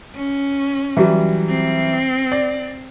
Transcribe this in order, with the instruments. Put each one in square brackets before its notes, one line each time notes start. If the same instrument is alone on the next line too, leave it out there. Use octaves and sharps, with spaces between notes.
[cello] C#4
[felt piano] E3 F#3 G3
[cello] C4
[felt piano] D5